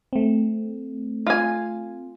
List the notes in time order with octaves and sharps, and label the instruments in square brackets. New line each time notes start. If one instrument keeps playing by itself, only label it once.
[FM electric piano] A3 C4
[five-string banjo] F4 G#5